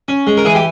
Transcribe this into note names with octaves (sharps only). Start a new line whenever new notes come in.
C#4
G#3
A#4
E3 G#4
G4